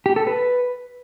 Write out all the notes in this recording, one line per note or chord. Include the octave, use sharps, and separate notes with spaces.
G4
A4
B4